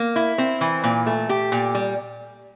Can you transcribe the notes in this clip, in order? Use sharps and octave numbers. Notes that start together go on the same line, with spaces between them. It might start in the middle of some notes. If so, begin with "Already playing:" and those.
Already playing: A#3
E4
C4
E3
A#2
A3
G4
A#2
G3